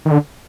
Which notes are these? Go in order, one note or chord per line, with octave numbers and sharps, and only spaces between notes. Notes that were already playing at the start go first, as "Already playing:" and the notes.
D#3
D3